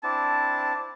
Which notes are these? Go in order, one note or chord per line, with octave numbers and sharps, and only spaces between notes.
C4 D4 E4 A5